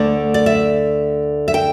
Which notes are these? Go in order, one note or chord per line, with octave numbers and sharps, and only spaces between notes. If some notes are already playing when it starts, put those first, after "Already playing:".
Already playing: D2 D3 A3 D5
D5
E5
E5
G5